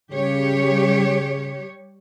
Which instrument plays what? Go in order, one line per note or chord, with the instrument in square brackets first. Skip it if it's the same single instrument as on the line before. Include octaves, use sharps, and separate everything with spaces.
[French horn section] C#3 [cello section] G3 G4 C#5